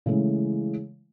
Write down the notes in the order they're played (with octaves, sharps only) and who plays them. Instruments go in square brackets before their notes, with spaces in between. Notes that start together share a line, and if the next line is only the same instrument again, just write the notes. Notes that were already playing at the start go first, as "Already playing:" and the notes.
[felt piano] C#3 E3 G#3 A3